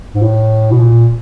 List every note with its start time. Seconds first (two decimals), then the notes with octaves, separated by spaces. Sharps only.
0.14 G#2
0.22 A2
0.71 B2
0.80 A#2